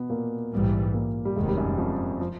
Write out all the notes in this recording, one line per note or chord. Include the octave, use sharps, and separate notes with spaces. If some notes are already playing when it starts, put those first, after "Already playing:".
Already playing: B2 B3
A#2 A#3
A#1 G#2 E3 G3
A#2 A#3
G3
F1 D#2 G#2 D#3 G#3
G3
F#2 F#3
F2 F3
F3